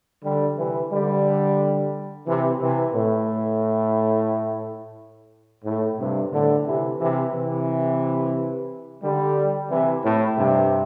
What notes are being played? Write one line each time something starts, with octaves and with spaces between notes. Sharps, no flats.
D3 G3
C3 E3
D3 G3
C3 E3
C3 E3
A2
A2
G2 C3
A2 D3
C3 E3
C3 E3
C3 E3
D3 G3
C3 E3
A2
G2 C3